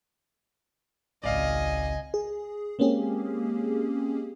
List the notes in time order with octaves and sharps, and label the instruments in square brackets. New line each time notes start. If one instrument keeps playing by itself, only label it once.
[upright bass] G#1 C#2 [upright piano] D5 F5 [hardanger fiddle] D#5 G#5
[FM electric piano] G#4
G#3 A#3 C4 C#4 G4 G#4